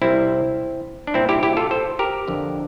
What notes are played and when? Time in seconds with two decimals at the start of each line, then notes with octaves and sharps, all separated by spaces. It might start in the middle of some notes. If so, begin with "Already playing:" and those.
0.01 C2 C3 G3 C4 E4
1.07 D4
1.14 C2 A#2 G3 C4 E4
1.29 E4 G4
1.43 E4 G4
1.57 F4 A4
1.71 A4 C5
1.99 G4 A#4
2.27 F2 D3 F3